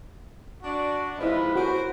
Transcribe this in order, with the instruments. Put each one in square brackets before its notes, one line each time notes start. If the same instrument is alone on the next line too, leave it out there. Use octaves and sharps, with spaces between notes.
[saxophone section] D4 [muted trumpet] F#4
[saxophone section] D#2 F3 G#3 [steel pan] E4 D#5 [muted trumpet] B4
[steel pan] F#4 [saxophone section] A#4 C5